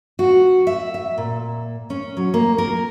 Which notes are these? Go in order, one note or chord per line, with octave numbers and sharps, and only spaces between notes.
F#4
E5
E5
A#2
C#4
F#3
A#3
A#4